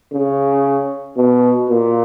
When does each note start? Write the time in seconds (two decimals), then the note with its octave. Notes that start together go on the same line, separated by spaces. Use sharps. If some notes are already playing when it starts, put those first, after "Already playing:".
0.13 C#3
1.17 B2
1.69 A#2